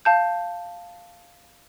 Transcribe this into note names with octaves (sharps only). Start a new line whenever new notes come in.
F5 A5 G6